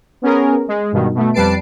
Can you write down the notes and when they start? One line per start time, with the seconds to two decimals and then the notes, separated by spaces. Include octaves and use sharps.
0.22 B3 C#4 G#4 A#4
0.68 G#3
0.92 G2 B2 D#3
1.15 B2 A3
1.34 F2 G3 B4 A5 C7 D7